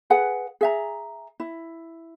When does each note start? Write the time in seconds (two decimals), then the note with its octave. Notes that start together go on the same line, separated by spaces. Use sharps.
0.10 G#4 B4 F#5
0.61 G#4 E5 A#5
1.40 E4